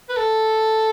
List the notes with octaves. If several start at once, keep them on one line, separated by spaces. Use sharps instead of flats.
B4
A4